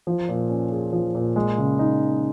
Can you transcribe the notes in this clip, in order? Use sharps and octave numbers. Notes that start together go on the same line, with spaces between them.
F3
A#2
C#4
G#4
F3
A#2
G#3
C#3
D#4